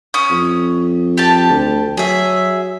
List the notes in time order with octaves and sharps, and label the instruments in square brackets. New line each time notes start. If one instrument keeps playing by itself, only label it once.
[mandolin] C#4 D#6
[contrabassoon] F2
[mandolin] G4 A5
[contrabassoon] D2
[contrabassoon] F#3 [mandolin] G#4 E5